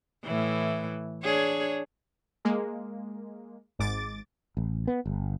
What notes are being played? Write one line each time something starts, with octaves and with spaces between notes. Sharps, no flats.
A2 E3
D4 G#4 C#5
G#3 A#3
G#1 G#2 D6 A6
A1
B3
G1